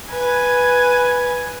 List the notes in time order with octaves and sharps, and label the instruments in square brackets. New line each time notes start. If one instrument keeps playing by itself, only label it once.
[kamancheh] B4 G#5